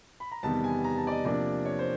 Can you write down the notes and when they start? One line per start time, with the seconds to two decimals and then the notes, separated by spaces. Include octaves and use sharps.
0.20 B5
0.32 A#5
0.43 E2 C3 D#3 G3 B3 A5
0.64 G#5
0.84 A#5
0.97 A5
1.07 D5
1.11 D#5
1.25 C3 F3 A#3 D4 D5
1.65 C#5
1.79 C5